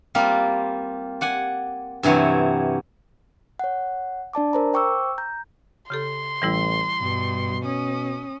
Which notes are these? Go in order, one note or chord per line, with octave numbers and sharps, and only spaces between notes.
G3 A#3 C4 F4
D5 F#5 G#5
G2 C3 E3 F#3 C#5
C#5 F#5
D4 D5 A5 D6
A#4 C5 A#5
C5 G5 C#6 D6 E6
A#5 G6
C#3 G4 A4 C6
A1 E3 G3 E4
G2 B2
C#4 D#6